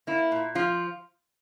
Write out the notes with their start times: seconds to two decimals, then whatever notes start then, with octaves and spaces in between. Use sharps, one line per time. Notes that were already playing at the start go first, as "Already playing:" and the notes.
0.07 A#3 E4
0.32 A#2
0.55 F3 F4